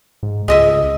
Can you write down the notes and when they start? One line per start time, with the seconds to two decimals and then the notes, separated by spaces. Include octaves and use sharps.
0.23 G#2
0.48 C#2 G#3 D#5 E5